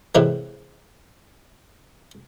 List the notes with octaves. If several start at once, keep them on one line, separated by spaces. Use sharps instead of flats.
A2 C3 E3 G#3